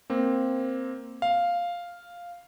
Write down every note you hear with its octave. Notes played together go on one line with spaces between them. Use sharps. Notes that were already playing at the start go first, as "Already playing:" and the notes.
A#3 C4
F5